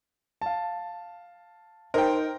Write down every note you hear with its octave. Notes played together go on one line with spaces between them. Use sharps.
F5 A5
D#4 A#4 C5 G5